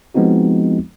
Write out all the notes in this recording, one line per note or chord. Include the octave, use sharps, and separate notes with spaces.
F3 G#3 B3 C4 D#4 F#4